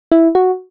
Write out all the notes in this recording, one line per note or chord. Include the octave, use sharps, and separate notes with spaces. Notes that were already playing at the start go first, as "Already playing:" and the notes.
E4
F#4